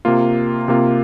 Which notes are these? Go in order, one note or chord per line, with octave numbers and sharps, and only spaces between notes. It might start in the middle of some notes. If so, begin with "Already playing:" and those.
C3 A#3 F4
C3 A#3 F4